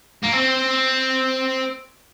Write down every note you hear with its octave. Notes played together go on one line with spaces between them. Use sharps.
A#3
C4